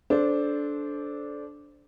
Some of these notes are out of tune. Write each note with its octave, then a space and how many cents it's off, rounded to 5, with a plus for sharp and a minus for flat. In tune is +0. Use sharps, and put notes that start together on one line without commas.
D4 -10 A4 -20 C5 +0